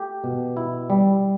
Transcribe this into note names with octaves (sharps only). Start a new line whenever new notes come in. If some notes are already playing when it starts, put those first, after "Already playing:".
Already playing: A3 G4
B2
E4
G3